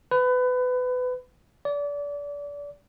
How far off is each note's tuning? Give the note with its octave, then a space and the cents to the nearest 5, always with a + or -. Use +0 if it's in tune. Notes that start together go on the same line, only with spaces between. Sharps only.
B4 +25
D5 -30